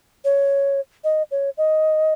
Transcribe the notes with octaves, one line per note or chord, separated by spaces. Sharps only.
C#5
D#5
C#5
D#5